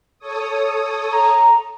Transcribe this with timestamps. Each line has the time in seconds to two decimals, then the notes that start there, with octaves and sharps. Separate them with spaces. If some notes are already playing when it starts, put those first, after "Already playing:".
0.19 A4 C#5 D#6
1.12 A#5